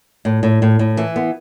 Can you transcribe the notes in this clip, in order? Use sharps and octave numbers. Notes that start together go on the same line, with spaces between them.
A2
A2
A2
A2
E3
B3